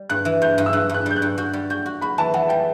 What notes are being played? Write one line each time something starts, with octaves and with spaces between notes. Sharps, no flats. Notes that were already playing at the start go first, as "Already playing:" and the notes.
Already playing: G3
G2 F#6
E3
G2 G6
G2
E6
G2 F#6
G2 F#6
G3 G6
F#6
G2
F#4 G6
G3
F#4 G6
F#4
F#4 B5
E3 A5
E3 F#5
G3 G5